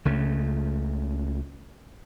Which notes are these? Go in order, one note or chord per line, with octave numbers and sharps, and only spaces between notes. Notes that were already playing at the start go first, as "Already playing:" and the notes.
C#2 C#3 A3